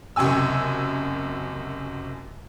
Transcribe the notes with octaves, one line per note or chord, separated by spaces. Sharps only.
F#1 F#2 C3 G#5 E6